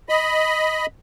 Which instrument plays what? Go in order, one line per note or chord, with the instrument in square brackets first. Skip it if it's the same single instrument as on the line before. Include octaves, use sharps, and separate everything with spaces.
[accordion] D#5 B5